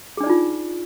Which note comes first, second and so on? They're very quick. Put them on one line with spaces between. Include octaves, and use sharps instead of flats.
G#4 D4 D5 D#4 F4